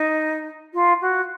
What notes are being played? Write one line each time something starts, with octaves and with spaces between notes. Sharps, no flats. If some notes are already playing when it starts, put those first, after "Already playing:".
Already playing: D#4
F4
F#4